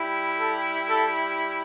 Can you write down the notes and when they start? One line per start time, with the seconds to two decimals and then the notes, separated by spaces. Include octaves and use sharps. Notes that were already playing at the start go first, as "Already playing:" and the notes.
Already playing: G3 E4 G4
0.37 A4
0.88 A4